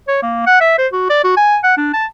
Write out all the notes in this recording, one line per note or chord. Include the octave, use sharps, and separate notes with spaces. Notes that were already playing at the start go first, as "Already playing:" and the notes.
C#5
A#3
F#5
E5
C5
F#4
D5
F#4
G#5
F#5
D4
A5